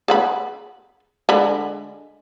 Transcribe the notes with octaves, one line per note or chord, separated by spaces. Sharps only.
G#4 F#5 B5
D3 G#3 B5